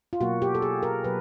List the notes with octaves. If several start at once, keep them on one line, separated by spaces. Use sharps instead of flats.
F4
B2 F#3 A#3 F#4
G4
A4
G#4
A#4
B2 F#3 B4